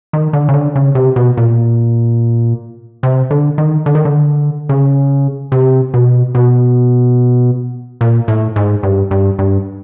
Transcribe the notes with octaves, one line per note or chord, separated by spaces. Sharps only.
D#3
D3
C#3
D3
C#3
C3
B2
A#2
C3
D3
D#3
D3
D#3
D3
C#3
C3
B2
B2
A#2
A2
G#2
G2
G2
G2